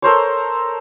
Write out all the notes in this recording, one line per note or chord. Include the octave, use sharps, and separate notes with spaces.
A4 A#4 C5 C#5